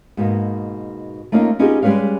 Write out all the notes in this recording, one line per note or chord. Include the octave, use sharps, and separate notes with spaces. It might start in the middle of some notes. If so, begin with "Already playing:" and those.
G#2 B2 A#3
A3 A#3 C#4 D#4 F4
B3 C#4 D#4 F4 G4 G#4
G3 G#3 C#4 B4 C#5 F5